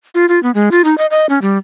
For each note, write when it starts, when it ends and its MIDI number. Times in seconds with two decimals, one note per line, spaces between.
0.15 0.26 65
0.29 0.41 65
0.43 0.51 59
0.55 0.69 56
0.71 0.82 65
0.84 0.97 63
0.98 1.06 75
1.11 1.26 75
1.29 1.39 61
1.42 1.58 55